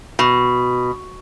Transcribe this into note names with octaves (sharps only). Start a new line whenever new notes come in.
B2